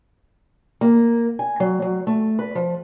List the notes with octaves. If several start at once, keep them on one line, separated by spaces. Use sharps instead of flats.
A#3
G#5
F#3
F#3
A3
B4
F3